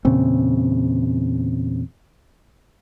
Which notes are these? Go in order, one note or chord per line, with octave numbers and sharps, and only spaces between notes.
E2 A#2 C#3 C4